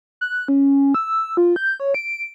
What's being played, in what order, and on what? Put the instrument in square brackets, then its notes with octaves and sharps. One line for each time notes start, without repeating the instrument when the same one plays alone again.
[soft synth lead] F#6
C#4
E6
F4
G6
C#5
D7